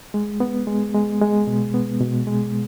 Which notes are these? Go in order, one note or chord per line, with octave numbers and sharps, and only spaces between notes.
G#3
B3
G#3
G#3
G#3
B2
B3
B2
G#3